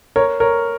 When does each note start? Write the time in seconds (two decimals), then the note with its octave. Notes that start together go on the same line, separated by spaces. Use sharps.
0.16 A#4 C#5
0.40 A#4 C#5